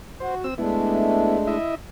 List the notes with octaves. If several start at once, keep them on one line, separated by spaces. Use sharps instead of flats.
F#4 C5
C4 E6
G#3 A3 B3 D4 E4
E4 D#5 E5